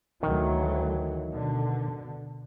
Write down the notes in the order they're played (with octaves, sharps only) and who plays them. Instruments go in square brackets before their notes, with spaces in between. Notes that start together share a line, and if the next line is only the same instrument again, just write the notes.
[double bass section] D2 E3 F#3 [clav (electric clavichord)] D#3
[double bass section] B2 D3